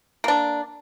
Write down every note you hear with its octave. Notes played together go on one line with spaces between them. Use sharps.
A#3 D4